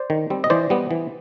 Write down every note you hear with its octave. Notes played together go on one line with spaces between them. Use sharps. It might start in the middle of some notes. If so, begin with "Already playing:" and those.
Already playing: C5 D5
D#3
G3 C4
D#5
E3 C5 D5
G3 B3
E3